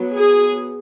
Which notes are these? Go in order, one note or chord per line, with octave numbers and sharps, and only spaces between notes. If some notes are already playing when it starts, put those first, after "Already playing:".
Already playing: F#3 B3
G#4